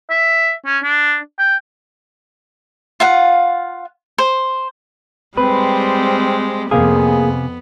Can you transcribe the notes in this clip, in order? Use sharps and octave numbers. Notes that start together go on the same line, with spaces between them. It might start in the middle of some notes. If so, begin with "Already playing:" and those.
E5
C#4
D4
G5
F4 F5 F#5
C5
G3 G#3 C4 B4
F2 C3 A#3 B3 G#4 F5 G#5